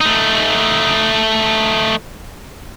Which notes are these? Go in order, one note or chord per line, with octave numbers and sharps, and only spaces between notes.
A3 D#4